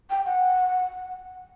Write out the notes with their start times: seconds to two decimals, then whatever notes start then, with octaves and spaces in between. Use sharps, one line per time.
0.10 G5
0.26 F#5